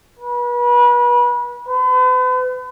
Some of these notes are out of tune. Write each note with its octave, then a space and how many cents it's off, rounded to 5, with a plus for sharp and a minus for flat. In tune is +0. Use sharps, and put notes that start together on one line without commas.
B4 -35
B4 +40